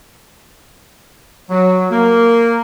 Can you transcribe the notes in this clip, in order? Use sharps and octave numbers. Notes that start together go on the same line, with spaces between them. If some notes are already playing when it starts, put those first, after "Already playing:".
F#3
A#3